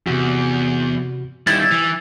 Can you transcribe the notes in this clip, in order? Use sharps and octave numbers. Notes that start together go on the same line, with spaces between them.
E2 C3 F#4
D#3 G3 E4 A6
E3